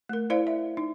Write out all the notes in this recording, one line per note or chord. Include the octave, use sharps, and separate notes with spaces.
A3 A#4
E4 C5 D5 F5
E5
D#4